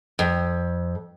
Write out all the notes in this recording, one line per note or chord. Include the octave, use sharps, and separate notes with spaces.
F2